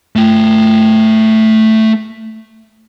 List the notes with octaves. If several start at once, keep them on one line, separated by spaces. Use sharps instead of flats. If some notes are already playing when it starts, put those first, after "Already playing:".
A3 G5